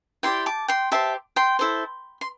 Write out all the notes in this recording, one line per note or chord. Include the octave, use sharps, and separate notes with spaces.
E4 G4 D5 G5 C6
A5 D6
G5 C6
G4 C5 E5 A5
G5 C6
E4 A4 C5
C6